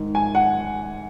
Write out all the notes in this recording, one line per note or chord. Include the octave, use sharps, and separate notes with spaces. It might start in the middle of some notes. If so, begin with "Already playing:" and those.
Already playing: G#2 D#3
G#5
F#5